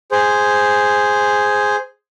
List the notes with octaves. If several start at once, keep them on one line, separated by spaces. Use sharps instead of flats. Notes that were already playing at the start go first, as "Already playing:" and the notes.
G#4 C5